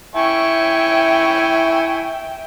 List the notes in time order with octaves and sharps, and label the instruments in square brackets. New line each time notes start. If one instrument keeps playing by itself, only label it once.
[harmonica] E4 G#5 C#6 [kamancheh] E5 G5